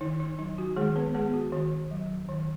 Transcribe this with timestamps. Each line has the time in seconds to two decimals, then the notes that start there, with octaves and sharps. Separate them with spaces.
0.01 D#3 D#4
0.20 D#4
0.39 F#3 D#4
0.58 F#4
0.76 D#3 G#3 G#4
0.96 B3 B4
1.14 G#3 B3 G#4
1.34 F#4
1.52 D#3 F#4
1.91 F#3
2.29 D#3